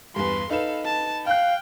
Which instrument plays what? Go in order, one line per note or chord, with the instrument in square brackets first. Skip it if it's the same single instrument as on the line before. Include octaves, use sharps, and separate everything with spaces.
[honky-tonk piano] E2 G2 [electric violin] B4 C6
[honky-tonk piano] D#4 B4 E7 [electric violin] A4 F5
[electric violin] A5
[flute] F5 [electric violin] G5 [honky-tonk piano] F6 F#6